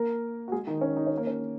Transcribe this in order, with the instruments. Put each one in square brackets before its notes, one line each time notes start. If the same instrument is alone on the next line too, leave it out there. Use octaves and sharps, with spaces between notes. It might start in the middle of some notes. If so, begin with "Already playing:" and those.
Already playing: [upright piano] A#3 A#4
F#4
G#3 G#4
D#3 D#4
C#4
D#4
C#4
A#3
C#4